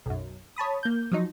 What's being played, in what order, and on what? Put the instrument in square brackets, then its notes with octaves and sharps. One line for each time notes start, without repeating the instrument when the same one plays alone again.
[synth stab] B1 F#2
C#5 A5 B5 D#6
A#3 G6
F3 F#3 D#4